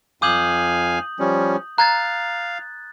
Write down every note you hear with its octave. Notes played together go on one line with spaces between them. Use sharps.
F2 F5 G#5 D6 D#6 G6 F#7
F3 G3 C#4
F5 A#5 F#6 G#6 A6